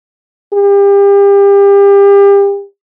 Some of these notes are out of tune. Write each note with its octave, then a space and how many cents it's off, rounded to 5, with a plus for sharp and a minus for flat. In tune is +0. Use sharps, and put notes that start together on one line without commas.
G4 +35